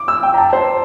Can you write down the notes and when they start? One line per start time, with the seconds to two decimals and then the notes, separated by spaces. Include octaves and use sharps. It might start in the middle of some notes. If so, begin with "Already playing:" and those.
Already playing: D6
0.08 E6
0.23 G5
0.34 A#5
0.38 A5
0.53 C5